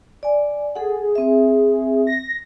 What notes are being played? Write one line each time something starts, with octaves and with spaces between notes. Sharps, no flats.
D5 G#5
G#4 A4 F#5
C4 E5
A#6